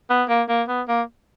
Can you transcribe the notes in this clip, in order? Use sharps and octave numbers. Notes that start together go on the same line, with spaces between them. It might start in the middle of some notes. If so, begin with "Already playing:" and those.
B3
A#3
A#3
B3
A#3